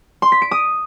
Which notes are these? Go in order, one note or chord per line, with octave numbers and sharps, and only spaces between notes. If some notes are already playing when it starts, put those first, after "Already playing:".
C6
B6
D7
D#6